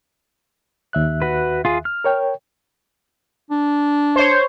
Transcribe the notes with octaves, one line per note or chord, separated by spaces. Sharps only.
D#2 E5 F#6
F#4 B4
F4 G#4
F6
A#4 C#5 G5
D4
C5 C#5